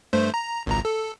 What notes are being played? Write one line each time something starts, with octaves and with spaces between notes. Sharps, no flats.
G2 A3 C5
A#5
G#1 C#2 A#5
A4